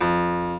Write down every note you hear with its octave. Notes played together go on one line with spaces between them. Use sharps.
F2